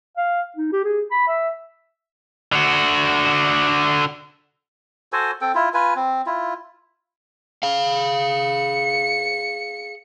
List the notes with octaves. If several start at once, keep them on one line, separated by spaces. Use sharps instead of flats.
F5
D#4
G4
G#4
B5
E5
D3 F#4
F#4 A4 C5 G#5
C4 A4 G5
E4 F4
F4 B4 G#5
C4
E4 F4
G#4 F5
C#7